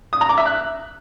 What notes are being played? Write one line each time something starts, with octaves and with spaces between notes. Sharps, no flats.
D#6
A#5
D6
E5
F#6